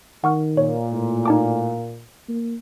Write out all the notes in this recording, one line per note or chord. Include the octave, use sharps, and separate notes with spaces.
D#3 F#5 C#6 F6
A#2 C#5
A2
D#4 A5 D6
A#3